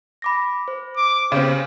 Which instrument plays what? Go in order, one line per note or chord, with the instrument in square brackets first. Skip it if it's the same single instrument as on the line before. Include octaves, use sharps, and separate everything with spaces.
[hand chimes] B5 D6 A#6
C5
[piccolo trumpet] D6
[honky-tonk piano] C#3 C4 [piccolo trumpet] G4